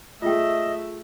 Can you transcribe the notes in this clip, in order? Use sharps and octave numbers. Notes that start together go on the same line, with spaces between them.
A3 F4 G#4 D#5 E5 G5